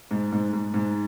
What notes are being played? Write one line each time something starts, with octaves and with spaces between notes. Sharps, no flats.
G#2
G#2
G#2
G#2